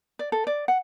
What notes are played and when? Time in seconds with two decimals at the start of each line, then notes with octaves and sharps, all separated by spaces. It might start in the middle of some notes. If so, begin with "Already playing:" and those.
0.19 D5
0.32 A4
0.47 D5
0.68 F#5